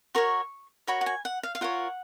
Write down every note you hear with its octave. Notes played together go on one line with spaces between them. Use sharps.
F#4 A#4 C#5 C#6
F#4 A#4 C#5 B5
F#5
G#5
F#5
F5
F5
F4 A#4 C#5 F#5